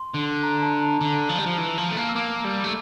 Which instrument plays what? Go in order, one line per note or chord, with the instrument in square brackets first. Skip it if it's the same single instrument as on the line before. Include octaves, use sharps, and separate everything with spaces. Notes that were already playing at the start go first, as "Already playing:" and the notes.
Already playing: [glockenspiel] C6
[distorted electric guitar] D3
[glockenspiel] A#5
A5
A#5
[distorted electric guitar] D3
F3
G3
F3
E3
F3
A3
A#3
[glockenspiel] E6
[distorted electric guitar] A#3 [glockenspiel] D6
[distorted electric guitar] G3
A3